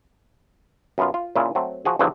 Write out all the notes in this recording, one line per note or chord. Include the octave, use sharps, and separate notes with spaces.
F#2 B3 F4
F4
A#2 C#3 D4 E4 F4
F#3 A3 C4
F3 F#4 G#4
E2 G2 D3 F3 F#3